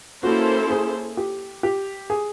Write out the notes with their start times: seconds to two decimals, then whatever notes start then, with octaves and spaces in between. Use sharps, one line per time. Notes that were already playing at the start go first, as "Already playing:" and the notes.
0.23 A#3 C#4 E4 F#4 A4 C5
0.71 G#4
1.17 G4
1.63 G4
2.10 G#4